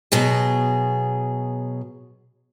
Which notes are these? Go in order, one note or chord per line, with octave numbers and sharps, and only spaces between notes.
B2 F#3 G#4